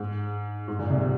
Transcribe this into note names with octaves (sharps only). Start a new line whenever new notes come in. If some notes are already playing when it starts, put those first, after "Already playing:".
Already playing: G#2
G#2
A#2
C2 C3
C3